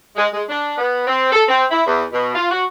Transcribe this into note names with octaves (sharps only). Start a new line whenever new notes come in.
G#3
G#3
D4
B3
C4
A4
C4
E4
E2
B2
F4
F#4